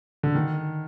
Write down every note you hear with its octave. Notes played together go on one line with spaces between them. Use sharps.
D3
D#3